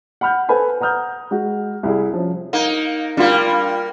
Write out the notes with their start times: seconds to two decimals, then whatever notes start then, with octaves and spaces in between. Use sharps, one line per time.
0.21 F#5 B5 F6 G6
0.49 A4 B4 C5 G#5 B5
0.81 F#5 A#5 D#6 F6 G6
1.31 G#3 F#4
1.83 C2 E4 G#4
2.14 F3 C#4
2.53 A#3 D#4
3.17 G3 A#3 D4 F4